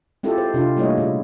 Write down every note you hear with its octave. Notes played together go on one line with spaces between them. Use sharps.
G#3 C4 E4 F4 G4 A4
C5
C3 D4 F4
G3 A3 A#3 E4 C#5 D#5
A#2 C#3